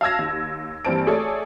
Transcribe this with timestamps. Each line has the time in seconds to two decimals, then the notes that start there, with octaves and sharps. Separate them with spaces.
0.01 F5 A5 E6 G#6 A#6
0.19 D#2
0.85 G2 E3 A#3 C4 A5 D7
1.07 A3 G#4 A4 C#5 D5